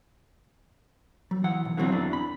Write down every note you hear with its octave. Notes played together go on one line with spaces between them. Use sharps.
F#3
E3 F#5
B1
D3 E3 F#3 C4
E2 E3 D4
B5